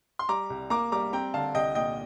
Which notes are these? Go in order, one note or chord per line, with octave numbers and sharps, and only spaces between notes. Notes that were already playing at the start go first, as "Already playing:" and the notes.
C6
G3 A#5 D6
C2
A#3 A#5 D6
G3 A#5 D6
C4 G5 A#5
D3 F5 A5
C2 D#5 G5
A#2 D#5 G5